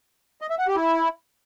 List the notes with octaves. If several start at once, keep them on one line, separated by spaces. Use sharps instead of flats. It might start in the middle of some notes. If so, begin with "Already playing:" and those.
D#5
E5
F#5
G4
E4